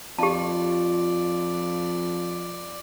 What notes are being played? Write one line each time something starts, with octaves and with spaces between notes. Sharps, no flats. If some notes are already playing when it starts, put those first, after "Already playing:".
F2 F4 G4 D5 A5